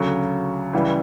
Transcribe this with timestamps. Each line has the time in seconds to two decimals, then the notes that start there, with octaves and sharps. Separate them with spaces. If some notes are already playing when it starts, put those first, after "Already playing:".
Already playing: D2 C#3 F#3
0.73 C#2 C#3 E3 G3